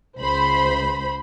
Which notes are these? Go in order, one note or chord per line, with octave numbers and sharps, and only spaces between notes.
C#2 C5 B5